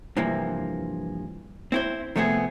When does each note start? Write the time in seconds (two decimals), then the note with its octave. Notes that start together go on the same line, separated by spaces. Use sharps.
0.17 G2 C3 E3 F3 A#3
1.72 C4 E4 C5
2.16 C3 F3 A3 B3 C4 G#4